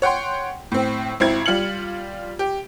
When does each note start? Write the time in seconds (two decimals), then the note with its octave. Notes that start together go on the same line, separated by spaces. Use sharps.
0.02 C#5 F#5 G5 C6
0.72 A2 C4
1.20 G#1 C4 E4 G#6
1.46 G3 F4 F6 C#7 F#7
2.39 G4